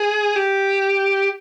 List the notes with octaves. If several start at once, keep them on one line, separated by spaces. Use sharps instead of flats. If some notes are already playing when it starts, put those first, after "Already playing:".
Already playing: G#4
G4